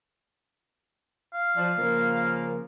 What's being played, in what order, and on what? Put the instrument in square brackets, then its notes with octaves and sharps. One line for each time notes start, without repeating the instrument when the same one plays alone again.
[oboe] F5
[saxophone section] F3 D5
C#3 F3 A#3